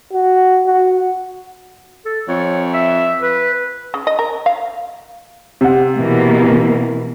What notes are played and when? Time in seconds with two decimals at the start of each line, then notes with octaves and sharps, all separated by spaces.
0.13 F#4
0.66 F#4
2.05 A4
2.28 F2 C#5
2.73 E5
3.22 B4
3.94 C#3
4.07 D#5
4.19 A#4
4.46 F5
5.61 C3 F#5
5.98 B2 E3 A#3